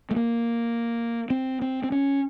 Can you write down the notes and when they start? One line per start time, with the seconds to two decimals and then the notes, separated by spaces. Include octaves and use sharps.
0.11 A3
0.16 A#3
1.30 C4
1.62 C4
1.83 C4
1.92 C#4